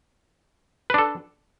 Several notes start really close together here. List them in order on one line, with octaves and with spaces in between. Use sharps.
B4 D4 A4